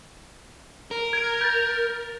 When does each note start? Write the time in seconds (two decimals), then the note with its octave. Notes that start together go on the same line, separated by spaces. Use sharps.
0.91 A#4
1.13 G#6 D7
1.41 G6 A6